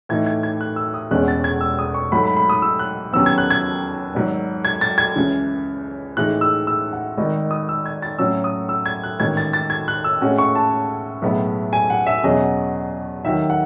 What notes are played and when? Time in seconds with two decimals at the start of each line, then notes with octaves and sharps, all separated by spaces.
0.09 A2 E3 A3 D#4 G#6
0.26 G#6
0.43 G#6
0.61 F#6
0.76 E6
0.94 D#6
1.11 E1 E2 B2 G#3 C#4 F#6
1.28 A6
1.44 G#6
1.61 E6
1.79 D#6
1.94 C#6
2.12 G#2 F#3 A3 B5
2.24 B5
2.36 B5
2.50 D#6
2.62 E6
2.79 F#6
3.13 D#2 C#3 F#3 B3 E6
3.26 G#6
3.38 F#6
3.50 G#6
4.14 G#1 G#2 F#3
4.65 G#6
4.81 A6
4.98 G#6
5.15 C#2 C#3 E3
6.17 A2 E3 G#3 D#4 F#6
6.41 E6
6.67 E6
6.93 F#5
7.17 G#1 G#2 D#3 D#5
7.51 D#6
7.69 E6
7.86 G#6
8.02 A6
8.19 A2 F#3 C#4 F#4 E6
8.44 D#6
8.69 E6
8.86 G#6
9.04 F#6
9.20 A1 G#2 D#3 G#6
9.37 A6
9.53 A6
9.70 G#6
9.88 F#6
10.04 E6
10.21 A2 G#3 C#4 F#4
10.38 C#6
10.55 A5
11.22 B1 A2 G#3 B3 E4
11.73 G#5
11.90 F#5
12.07 E5
12.23 E2 B2 F#3 C#4 G#4 D#5
13.24 D#2 D#3 F#3 E5
13.50 F#5